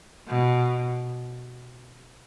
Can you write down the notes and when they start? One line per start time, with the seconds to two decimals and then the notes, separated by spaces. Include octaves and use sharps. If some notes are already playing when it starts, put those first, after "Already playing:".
0.28 B2